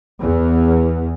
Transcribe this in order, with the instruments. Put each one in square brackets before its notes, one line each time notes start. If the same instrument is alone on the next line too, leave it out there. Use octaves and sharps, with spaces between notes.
[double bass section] E2